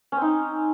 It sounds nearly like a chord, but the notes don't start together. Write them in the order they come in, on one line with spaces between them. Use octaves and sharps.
C#4 C4 D#4